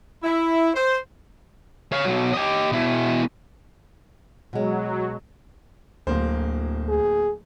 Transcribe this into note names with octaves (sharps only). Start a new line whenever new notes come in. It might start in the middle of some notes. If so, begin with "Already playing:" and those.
E4
C5
C#5 F5
B2 F#3
G4 D#5
B2 E4
B2 F#3 G#3
D1 D2 A#3 C5
G#4